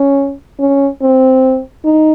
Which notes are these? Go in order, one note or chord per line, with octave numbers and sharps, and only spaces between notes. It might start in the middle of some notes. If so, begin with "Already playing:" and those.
Already playing: C#4
C#4
C4
D#4